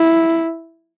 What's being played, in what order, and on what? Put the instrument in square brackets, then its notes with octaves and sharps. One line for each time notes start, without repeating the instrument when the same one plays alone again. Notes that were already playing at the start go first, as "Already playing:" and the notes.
Already playing: [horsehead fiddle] E4